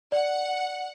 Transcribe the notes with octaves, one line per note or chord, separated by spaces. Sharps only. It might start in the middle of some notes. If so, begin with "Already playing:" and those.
D5 F#5